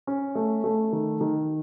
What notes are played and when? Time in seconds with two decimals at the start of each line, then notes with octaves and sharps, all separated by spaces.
0.07 C#4
0.35 A3
0.64 A3
0.93 D#3
1.21 D#3